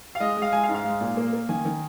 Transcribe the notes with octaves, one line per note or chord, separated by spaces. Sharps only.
F5
G#3 D#5
G#3
F5
G#3 G#5
F5
G#2
F5
G#3
A#2
A#3
A#3
D#3 G#5
D#3